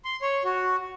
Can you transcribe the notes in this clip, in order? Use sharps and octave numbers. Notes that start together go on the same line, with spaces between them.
C6
C#5
F#4